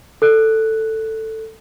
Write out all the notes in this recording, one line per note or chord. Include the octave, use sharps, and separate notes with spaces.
A4 F#6